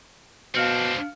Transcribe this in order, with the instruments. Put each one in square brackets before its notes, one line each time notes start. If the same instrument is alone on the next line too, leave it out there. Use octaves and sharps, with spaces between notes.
[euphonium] B2 [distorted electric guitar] C4 D4 [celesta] F5 F6 C#7